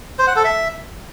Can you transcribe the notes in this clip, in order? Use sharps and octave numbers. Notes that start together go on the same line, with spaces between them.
C5
F#5
A4
E5